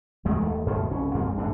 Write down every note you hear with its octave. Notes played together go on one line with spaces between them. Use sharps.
A#1 E2 G#3 A3
D#2 D#3 A3
F#2 B2 D#3 A3
F#1 C2 C#4
D2 G2 A3 C4
D#2 A2 G#3 D4